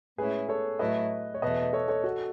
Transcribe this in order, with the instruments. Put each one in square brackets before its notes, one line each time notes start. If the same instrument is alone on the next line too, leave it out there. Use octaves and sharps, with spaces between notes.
[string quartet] A2 G#3 C#4 E4 [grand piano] G#4 B4
[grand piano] A4 C#5
[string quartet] A2 F#3 A3 E4 [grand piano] B4 D#5
[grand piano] C#5
[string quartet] E2 B2 A3 [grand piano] B4 D#5
[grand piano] A4 C#5
A4 C#5
F#4 A4